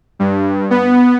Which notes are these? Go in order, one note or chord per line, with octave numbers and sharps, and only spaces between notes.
G2
B3